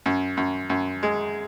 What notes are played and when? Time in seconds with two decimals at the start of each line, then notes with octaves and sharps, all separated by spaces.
0.06 F#2
0.37 F#2
0.70 F#2
1.03 G#3